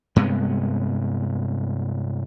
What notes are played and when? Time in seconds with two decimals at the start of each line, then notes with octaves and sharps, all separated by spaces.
0.16 G2 C3 G#3 B3